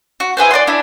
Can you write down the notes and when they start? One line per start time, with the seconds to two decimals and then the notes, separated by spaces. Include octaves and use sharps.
0.20 F#4
0.37 E4 G#4 B4 C5
0.51 D5 D#5 F#5 C6
0.67 D4 E4 B5